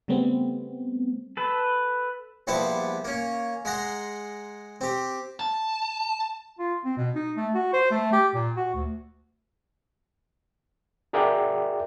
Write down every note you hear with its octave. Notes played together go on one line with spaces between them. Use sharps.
C#3 G3 A3 B3 C4
A4 B4
A#1 G3 B3 E4 C5 A5
A#3 C#4
G#3 F#5 A#5 C6
C4 G4
A5
F4
C4
B2
D#4
A3
F#4
C5
A3
G4
A#2
F#4
D2
F#4 G#4 A#4 D5 E5 G5